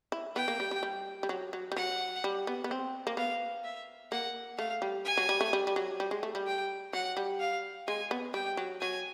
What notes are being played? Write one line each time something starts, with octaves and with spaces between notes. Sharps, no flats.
E4
B3 G5
A#3
G3
G3
G3
G3
F#3
F#3
G3
F#3 F#5
G3
B3
B3
C4
A#3
B3 F5
E5
A#3 F#5
A3 F5
G3
G#5
F#3
G3
A3
G3
G3
F#3
G3
G#3
A3
G3
G5
F#3 F#5
G3
F5
G#3 G#5
B3
G3 G5
F#3
F#3 G#5